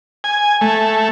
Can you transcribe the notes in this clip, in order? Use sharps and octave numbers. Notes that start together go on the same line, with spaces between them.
G#5
A3